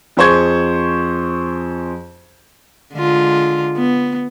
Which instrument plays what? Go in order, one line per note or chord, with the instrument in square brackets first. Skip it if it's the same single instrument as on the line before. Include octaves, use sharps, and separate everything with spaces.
[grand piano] F2 G#4 C5 C#6 G#6
[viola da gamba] D3 G#3 F4
B3